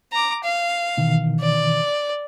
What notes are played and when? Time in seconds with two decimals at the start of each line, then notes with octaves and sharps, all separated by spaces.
0.12 A#5 D6
0.44 F5
0.97 B2 D#3 E3
1.40 D5